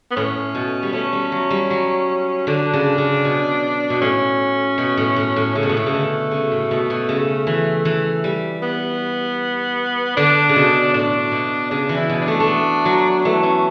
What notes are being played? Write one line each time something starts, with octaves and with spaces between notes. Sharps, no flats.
B3
A2 C#4
B2
G3
A3 C#4
G3
F#3
G3
F#3
D3 D4
C#3
C#3
B2
B2
A2 C#4
B2
A2
A2
A2
C#3 A3
B2
A2
B2
C#3
D3
C#3
A2
B2
B2
C#3
E3
E3
G3
B3
D3 D4
C#3
B2
A2 D4
B2
C#3 D4
E3
E4
B2
D4
A3
A3
B3
F#3
E3 A3
C#4